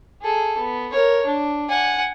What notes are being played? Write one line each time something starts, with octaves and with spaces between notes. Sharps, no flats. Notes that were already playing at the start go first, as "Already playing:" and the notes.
G#4 A4
B3
A#4 C#5
D4
F#5 G#5